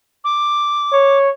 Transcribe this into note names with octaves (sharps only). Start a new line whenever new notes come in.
D6
C#5